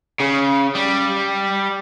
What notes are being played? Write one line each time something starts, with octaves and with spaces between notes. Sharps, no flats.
C#3
G3